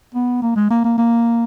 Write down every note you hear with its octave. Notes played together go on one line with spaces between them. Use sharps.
B3
A#3
G#3
A#3
A#3
A#3